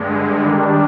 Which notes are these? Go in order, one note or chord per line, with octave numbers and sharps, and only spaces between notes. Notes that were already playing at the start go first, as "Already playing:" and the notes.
Already playing: G2 D3 G#3
D#3 G3 D4